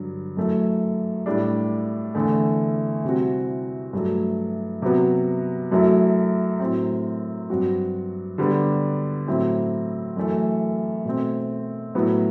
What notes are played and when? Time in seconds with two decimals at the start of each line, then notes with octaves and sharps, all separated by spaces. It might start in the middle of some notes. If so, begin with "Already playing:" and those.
Already playing: G2 D3 F#3
0.37 F#2 F#3 A3 E4
1.26 A2 G3 D4
2.15 E2 D3 A3
3.04 C3 G3 C4 F#4
3.93 G2 F#3 A3
4.82 C3 F#3 B3 F#4
5.71 F#2 F#3 A3 E4
6.60 A2 F#3 C4
7.50 G2 F#3 C4 F#4
8.38 D3 G3 B3 D4
9.27 A2 F#3 C4 E4
10.17 F#2 E3 A3
11.05 B2 A3 C4
11.94 A2 F#3 B3 E4